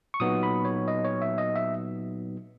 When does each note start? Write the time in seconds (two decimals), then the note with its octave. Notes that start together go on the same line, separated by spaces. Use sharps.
0.14 C#6
0.20 A#2 F#3 B3 D#4 D#6
0.43 B5
0.65 C#5
0.88 D#5
1.05 C#5
1.22 E5
1.38 D#5
1.56 E5